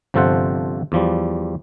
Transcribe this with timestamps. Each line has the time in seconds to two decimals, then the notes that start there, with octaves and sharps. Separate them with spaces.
0.14 G1 C3 F3 A4 C5 F#5
0.92 E2 F3 G3